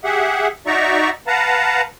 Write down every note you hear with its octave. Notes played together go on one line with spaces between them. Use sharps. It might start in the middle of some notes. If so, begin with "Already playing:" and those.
G4 G#4 E5 F#5
D#4 F#4 D5 E5 A#5 C#6
B4 F5 F#5 A5 A#5